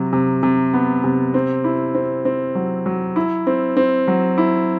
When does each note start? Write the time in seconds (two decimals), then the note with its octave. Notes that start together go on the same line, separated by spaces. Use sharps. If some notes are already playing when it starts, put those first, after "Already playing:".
Already playing: C3 F#3
0.13 C3
0.43 C3
0.74 B3
1.04 C3
1.34 C4
1.64 E4
1.95 C4
2.25 C4
2.55 F#3
2.86 F#3
3.16 E4
3.47 C4
3.77 C4
4.08 F#3
4.38 E4